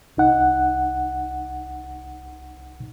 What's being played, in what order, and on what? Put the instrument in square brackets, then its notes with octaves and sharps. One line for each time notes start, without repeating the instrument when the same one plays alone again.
[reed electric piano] C2 D#4 F#5